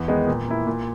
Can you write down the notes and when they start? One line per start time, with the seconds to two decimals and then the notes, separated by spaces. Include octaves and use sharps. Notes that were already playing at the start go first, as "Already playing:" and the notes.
Already playing: E2
0.08 D#3 G#3 B3 D#4
0.28 A#2
0.48 A#3 E4
0.67 A#2